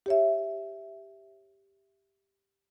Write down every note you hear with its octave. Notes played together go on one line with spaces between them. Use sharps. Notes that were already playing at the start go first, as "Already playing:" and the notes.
G4 C#5 E5